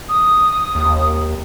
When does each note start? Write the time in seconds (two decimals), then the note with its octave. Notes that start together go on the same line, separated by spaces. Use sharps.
0.09 D#6
0.75 D#2